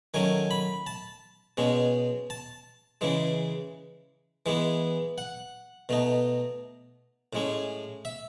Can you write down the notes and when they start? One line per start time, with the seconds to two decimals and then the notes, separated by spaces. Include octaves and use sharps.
0.14 D#3 F#3 A3 C#4 G#5
0.51 B5
0.87 A5
1.57 B2 G#3 C#4
2.30 A5
3.01 C#3 E3 G#3
4.46 E3 G#3 B3
5.18 F#5
5.89 B2 A3 D#4
7.33 A2 G#3 C#4
8.05 E5